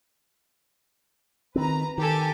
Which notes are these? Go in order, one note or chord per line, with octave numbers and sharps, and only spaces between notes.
D#3 C4 B4 A#5
D#3 G4 A4 G#5